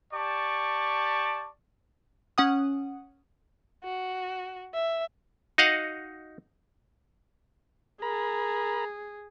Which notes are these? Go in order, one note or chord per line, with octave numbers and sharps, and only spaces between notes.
G4 D5 A5 C#6
C#4 F#5 D#6
F#4
E5
D#4 F#4 D#5 F5 F#5
G#4 A#4 A#5 B5